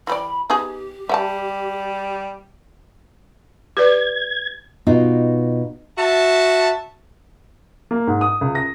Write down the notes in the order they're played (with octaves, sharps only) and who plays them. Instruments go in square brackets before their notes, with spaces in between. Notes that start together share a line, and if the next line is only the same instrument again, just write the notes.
[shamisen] E3 G3 D5 [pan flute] B5
[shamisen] B3 D#4 G#4 [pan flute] G4
[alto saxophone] G3 [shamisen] E5 F#5 A5
[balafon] G4 B4 D5 [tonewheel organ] G#6
[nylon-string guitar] B2 D#4 F4
[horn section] F#4 E5 A5
[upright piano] A#3
G#2
D#6
C#2
A#6